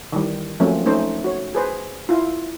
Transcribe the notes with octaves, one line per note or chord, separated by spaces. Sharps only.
D#3 E3 G3
F3 F#3 A3 A#3 C4 C#4
A3 C#4 D#4 C5
F#4 C#5
G#4 B4 C5
E4 F4